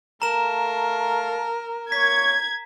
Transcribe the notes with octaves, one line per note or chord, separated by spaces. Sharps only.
A3 A#4 F5 A5 A#5 E7
A#3 C#5 C#6 G#6 B6